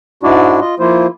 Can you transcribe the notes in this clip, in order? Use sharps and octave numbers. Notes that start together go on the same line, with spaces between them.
G#2 G#3 D4 E4 F#4 D5
F4 D#5
F3 A#3 E4 F4 C5